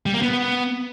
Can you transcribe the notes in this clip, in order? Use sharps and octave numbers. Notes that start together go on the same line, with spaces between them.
G3
A#3
B3